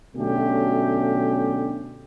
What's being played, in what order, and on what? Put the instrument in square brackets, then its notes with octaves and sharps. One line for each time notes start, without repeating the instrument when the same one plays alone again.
[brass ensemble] B2 D3 F#3 A3 C#4 G4